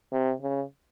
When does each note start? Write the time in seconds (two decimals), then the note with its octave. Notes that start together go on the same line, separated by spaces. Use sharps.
0.13 C3
0.42 C#3